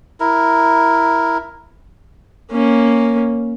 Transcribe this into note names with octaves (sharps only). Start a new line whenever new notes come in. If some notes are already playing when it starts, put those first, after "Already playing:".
E4 A#4
A#3 C#4